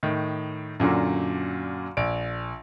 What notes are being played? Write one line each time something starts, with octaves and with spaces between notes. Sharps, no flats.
A2 D#3
F#2 A#2 D3 F#3
A#1 D7